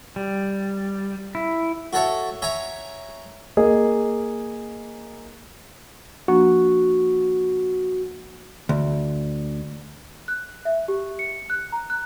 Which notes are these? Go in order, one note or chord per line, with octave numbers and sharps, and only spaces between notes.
G3
E4
F#4 A4 C#5 E5
C#5 E5 G#5 A#5
A#3 G#4 D#5
F3 A#3 D4 F#4
D2
F#6
E5
G4
C#7
F#6
A#5
F#6